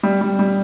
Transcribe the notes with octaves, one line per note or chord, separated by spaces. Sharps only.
G3
G3
G3